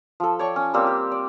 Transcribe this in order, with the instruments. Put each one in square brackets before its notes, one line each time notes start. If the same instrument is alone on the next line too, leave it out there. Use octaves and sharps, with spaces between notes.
[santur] F3 A4
C#5 D5 G5 C#6
C#4
G3 A#3 C4 E6
G4
D5